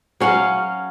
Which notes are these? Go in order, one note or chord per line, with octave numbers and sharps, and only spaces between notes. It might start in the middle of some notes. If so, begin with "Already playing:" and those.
F#3 C#4 F5 F#5